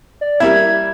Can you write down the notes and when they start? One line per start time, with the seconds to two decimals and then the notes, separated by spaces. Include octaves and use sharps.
0.21 D5
0.40 G3 A#3 E4 G#6